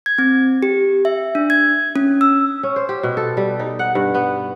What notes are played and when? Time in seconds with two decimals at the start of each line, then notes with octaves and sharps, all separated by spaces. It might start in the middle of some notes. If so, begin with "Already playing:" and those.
0.06 G#6
0.18 C4
0.63 G4
1.05 E5
1.35 D4
1.50 G#6
1.96 C#4
2.21 E6
2.63 C#4
2.76 C5
2.89 G4
3.03 B2
3.17 A4
3.37 G3
3.59 D#4
3.79 F#5
3.95 G2
4.14 B3